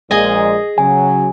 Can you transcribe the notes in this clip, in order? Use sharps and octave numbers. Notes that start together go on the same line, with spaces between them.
A#1 A#2 G#3 G#4 D#5
C#3 F#3 G#5